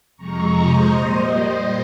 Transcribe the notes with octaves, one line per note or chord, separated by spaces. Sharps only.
F2 C3 F3 G#3 A#5 C#6
C5 D#5
A#2 G3